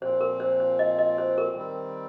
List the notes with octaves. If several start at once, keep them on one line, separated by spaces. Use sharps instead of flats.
A#2 F3 C4 C5
A#4
C5
C5
D#5
D#5
C5
A#4
D#3 G3 C4